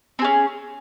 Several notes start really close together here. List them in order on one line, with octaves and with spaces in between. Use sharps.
C4 G#4 C#4